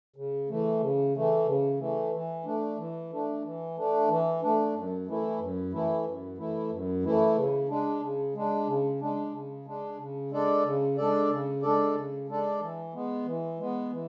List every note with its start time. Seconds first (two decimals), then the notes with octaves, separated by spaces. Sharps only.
0.16 C#3
0.49 E3 A3
0.80 C#3
1.14 E3 A3
1.46 C#3
1.79 E3 A3
2.13 E3
2.45 A3 D4
2.78 E3
3.10 A3 D4
3.43 E3
3.76 A3 D4
4.08 E3
4.42 A3 D4
4.74 F#2
5.06 E3 A3 E4
5.40 F#2
5.73 E3 A3 E4
6.05 F#2
6.37 E3 A3 E4
6.71 F#2
7.03 E3 A3 E4
7.36 C#3
7.69 G#3 D4
8.01 C#3
8.35 G#3 D4
8.67 C#3
9.00 G#3 D4
9.33 C#3
9.65 G#3 D4
9.98 C#3
10.31 G#3 D4 A4 D5
10.64 C#3
10.97 G#3 D4 A4 D5
11.30 C#3
11.62 G#3 D4 A4 D5
11.95 C#3
12.28 G#3 D4 A4 D5
12.61 E3
12.93 G#3 B3
13.26 E3
13.59 G#3 B3
13.92 E3